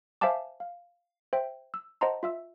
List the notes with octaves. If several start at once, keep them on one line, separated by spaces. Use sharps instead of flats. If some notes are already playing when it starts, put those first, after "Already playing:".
C5 E5 F5 G#5 A5 D6
F5
C5 E5 G5
E6
C5 D#5 F#5 A5 A#5 C6
F4 E5 E6